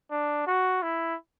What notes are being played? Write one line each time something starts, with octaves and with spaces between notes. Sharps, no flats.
D4
F#4
E4